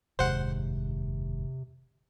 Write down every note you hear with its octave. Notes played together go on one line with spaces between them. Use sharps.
F1 D#2 G#2 C3 C5 F#5